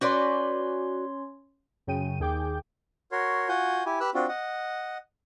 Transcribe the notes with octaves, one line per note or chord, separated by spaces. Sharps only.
C#4 F#4 B4 C#5 D5 C6
F#2 C#3 G5 D#7
D#2 G#4 G5 D6 G6
F#4 A#4 C#5 C6
F4 F#4 F#5 G#5 G6
E4 G4 G#5
G4 B4 E6 F#6
C4 D4 F4 F#4
D#5 F#5